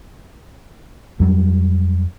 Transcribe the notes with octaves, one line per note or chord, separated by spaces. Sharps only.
F2 F#3 G3